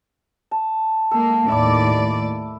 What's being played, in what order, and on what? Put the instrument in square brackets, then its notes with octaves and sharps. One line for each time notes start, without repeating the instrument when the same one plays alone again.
[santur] A5
[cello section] G#3 A#3 [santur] A4
[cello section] D#2 A2 D5 [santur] E5 B5 D6